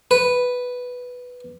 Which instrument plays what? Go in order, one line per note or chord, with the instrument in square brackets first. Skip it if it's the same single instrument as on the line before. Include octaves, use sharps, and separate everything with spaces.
[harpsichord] B4